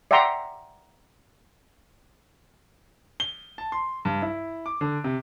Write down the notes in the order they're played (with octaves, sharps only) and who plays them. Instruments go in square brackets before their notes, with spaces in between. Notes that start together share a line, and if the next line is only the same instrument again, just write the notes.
[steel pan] D5 E5 F#5 G5 A#5 C6
[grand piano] G7
A5
C6
G2
E4
D6
D3
C3